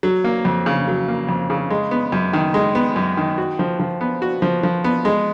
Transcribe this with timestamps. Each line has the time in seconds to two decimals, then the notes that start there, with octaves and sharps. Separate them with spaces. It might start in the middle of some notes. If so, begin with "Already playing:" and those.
0.03 F#3
0.24 A#3
0.45 F2
0.66 C#3
0.87 F#3
1.08 A#3
1.29 F2
1.50 C#3
1.70 G#3
1.91 B3
2.12 F#2
2.33 D#3
2.54 G#3
2.75 B3
2.96 F#2
3.17 D#3
3.38 F#4
3.59 F3
3.80 F3
4.01 B3
4.22 F#4
4.42 F3
4.63 F3
4.84 B3
5.05 G#3